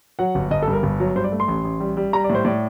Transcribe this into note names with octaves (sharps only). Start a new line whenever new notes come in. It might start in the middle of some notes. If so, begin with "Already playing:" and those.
F#3 F#5
G1
G1 D#5
A4
G2
A#4
G1
F#3
G2 C5
D5
A3
C6
A1
A1
G3
G3
G3 A#5
D5
A2
C5
A2 D5